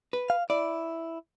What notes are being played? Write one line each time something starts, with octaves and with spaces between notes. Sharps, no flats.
B4
F5
E4 D5